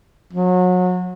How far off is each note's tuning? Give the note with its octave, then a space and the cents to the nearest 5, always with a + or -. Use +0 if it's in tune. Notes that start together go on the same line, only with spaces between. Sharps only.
F#3 -30